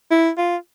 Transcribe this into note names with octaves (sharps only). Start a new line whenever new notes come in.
E4
F4